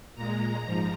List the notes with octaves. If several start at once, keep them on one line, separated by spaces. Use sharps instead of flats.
A#2 G#3 A#5
G#2 F3